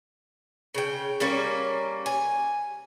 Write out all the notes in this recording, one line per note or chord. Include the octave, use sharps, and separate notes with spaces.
C#3 G5
G3 A#3 C#4
G#5